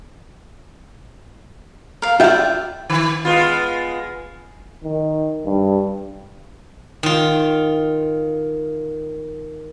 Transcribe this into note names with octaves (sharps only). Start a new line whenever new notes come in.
A#4 F5
F4 D5 E5 G5
D#3
G#3 B3 F4
D#3
G2
D#3 F4